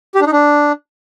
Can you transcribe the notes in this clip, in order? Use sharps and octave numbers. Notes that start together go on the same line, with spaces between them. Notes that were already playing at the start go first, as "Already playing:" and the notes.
G4
D4
D#4
D4